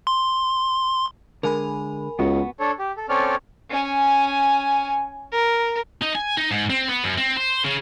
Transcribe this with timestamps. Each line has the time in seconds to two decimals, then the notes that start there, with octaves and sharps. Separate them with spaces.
0.07 C6
1.43 D3 G#3 A#4 G#5 B5
2.19 C#2 B3 F#4
2.59 D4 A4 C#5
2.79 G4
2.97 A4
3.09 C4 C#4 A4 C#5 D5 F6
3.70 C#4 G#5
5.32 A#4
6.02 D#4
6.15 G#5
6.37 D#4
6.51 G#2
6.70 C4
6.89 B3
7.04 F#2
7.18 C4
7.37 C5
7.65 C#3